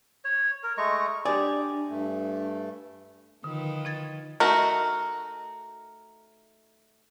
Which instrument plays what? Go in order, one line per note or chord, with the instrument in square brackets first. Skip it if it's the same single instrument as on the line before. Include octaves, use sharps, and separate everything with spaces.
[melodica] C#5
A#4
G#3 A3 A#5 C#6
[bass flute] D4 [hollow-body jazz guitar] G4 D5 [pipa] G#4
[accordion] G2 A3
[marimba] D3 [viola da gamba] D#3 F3 B4
[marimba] D#4 G#6 A6
[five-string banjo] A3 D#4 F#4 [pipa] A#4